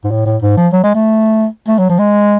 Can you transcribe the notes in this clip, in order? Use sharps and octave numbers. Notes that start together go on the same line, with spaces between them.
G#2
A2
A2
G#2
F3
F#3
G#3
A3
A3
F#3
F3
G#3